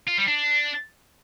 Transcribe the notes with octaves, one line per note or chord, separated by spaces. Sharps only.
F4
G3
D4